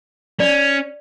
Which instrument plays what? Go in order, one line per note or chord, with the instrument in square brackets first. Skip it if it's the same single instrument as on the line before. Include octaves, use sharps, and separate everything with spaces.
[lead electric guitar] C#4 [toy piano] D5